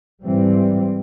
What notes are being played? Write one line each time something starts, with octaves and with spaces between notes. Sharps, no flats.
G#2 E3 G3 C4